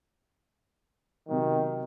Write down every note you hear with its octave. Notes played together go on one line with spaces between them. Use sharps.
C3 D#3 F#3